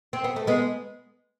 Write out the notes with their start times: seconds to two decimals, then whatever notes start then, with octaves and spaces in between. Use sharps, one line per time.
0.13 C4
0.24 B3
0.36 A3
0.47 G#3 B3